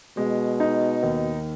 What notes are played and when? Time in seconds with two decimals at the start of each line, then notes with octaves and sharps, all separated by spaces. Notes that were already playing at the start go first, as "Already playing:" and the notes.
0.17 B2 G#3
0.60 D#4
1.03 D#2